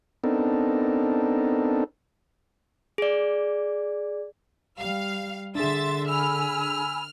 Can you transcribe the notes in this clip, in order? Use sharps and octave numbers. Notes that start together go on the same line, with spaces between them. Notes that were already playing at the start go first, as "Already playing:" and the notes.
B3 C4 D4 D#4 A4 A#4
G#4 D5
G3 F5
D3 D4 G#4 E5 C6 A6
G#5 B5 E6 F6